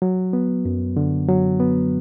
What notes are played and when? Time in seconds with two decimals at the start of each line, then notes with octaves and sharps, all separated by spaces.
0.02 F#3
0.33 B3
0.65 F#2
0.97 D3
1.28 F#3
1.60 B3